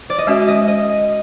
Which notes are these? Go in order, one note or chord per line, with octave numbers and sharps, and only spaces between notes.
D5
D#5
G#3 C#4 F#4 E5
D#5
D#5